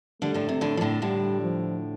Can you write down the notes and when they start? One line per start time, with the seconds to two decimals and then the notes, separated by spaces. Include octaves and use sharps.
0.22 D3 G3 A3
0.34 A2 D3
0.49 C3
0.61 A2 D3
0.77 F3
0.81 A2 D3
1.02 A2 D3 G3
1.42 F3